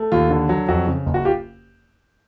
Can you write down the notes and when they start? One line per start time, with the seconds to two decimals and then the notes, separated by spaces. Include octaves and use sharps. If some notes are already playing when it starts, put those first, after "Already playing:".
Already playing: A3
0.12 D#2 F4
0.30 D3
0.49 F#3
0.68 F2 F#4
0.87 C#3
1.06 F#1
1.14 F#4
1.25 F4 G4